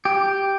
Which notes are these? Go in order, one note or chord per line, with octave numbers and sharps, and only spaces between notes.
G4